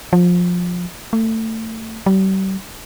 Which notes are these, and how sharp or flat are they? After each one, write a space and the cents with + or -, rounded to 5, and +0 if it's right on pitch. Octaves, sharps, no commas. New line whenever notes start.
F3 +20
A3 +25
G3 -40